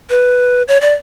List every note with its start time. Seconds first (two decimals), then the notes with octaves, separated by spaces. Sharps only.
0.10 B4
0.68 C#5
0.81 D5